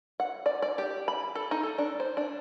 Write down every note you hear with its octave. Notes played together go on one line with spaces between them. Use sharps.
F#5
D5
D5
G4
B5
A4
D#4
A4
D4
C5
D4